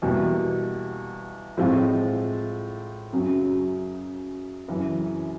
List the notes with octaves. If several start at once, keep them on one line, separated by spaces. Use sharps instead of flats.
E2 B2 G3 A#3
A2 F3 G#3 C4 F4
F#2 C#3 F#3
F#2 C#3 E3